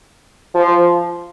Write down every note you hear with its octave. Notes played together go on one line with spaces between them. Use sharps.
F3